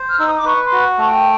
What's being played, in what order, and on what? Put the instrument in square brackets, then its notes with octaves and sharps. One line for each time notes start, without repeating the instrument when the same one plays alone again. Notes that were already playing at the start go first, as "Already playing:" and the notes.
Already playing: [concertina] C5
[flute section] F6
[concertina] D#4 [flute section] E6
[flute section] D#6
D6
[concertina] B4 [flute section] C#6
[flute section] C6
[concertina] F#4
A3
[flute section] G5